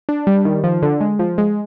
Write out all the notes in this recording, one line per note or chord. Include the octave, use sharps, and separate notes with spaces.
D4
G3
D#3
F3
D3
G#3
F3
G#3